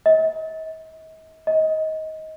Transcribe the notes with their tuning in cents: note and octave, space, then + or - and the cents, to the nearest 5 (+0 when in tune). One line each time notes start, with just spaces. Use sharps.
D#5 +45
D#5 +20